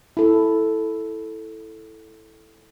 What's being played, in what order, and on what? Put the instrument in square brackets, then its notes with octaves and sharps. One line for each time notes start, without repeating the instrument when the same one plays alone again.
[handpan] E4 A4